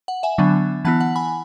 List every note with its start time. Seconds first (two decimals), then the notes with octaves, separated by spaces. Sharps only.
0.08 F#5
0.23 E5 G#5
0.38 D3 F#3 B3 D4
0.85 E3 B3 E4 F#5 A5
1.00 F#5
1.16 G#5 B5